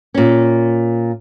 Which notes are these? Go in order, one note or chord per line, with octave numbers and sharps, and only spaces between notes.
A#2 C#4